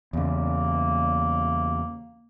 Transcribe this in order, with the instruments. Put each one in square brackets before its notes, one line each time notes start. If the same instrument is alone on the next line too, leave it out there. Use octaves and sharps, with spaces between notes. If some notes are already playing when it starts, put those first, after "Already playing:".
[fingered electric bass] E2 C#3 [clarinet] A#3